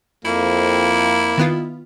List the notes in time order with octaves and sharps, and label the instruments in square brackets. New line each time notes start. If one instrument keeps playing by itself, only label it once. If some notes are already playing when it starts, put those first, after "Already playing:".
[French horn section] F2 [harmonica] A#3 [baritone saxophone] E4
[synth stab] D#3 B3 F4